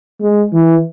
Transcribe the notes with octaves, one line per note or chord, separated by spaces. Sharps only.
G#3
E3